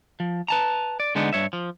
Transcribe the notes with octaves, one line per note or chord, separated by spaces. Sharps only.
F3
B4 A5 A#5
D5
D3 G#3 B3 D4 D#4
G2 C#5 E5
F3